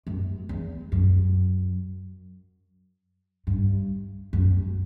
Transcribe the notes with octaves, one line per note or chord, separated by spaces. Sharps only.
F#2
E2
F#2
G2
F#2